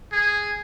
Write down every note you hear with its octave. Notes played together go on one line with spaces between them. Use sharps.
G#4